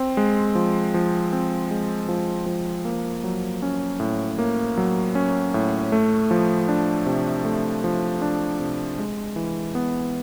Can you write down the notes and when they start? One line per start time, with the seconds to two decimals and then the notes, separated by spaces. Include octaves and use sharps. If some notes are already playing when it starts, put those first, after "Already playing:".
Already playing: C4
0.17 G#3
0.55 F3
0.94 F3
1.33 C4
1.71 G#3
2.09 F3
2.46 F3
2.85 A#3
3.24 F#3
3.62 C#4
4.00 A2
4.39 A#3
4.77 F#3
5.15 C#4
5.54 A2
5.92 A3
6.31 F3
6.68 D4
7.06 C3
7.45 A3
7.84 F3
8.22 D4
8.59 C3
8.98 G#3
9.36 E3
9.75 B3